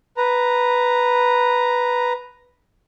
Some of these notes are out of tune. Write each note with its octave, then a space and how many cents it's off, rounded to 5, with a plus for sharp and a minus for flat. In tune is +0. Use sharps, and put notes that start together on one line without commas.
B4 +0 A#5 +0